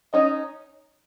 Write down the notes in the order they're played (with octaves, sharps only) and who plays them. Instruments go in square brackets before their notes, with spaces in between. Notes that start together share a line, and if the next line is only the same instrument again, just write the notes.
[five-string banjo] C#4 D#4 [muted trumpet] D#5